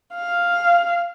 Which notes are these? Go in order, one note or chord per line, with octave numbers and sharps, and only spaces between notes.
F5